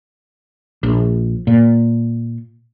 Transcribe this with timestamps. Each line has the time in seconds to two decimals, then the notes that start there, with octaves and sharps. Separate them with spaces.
0.83 A#1
1.47 A#2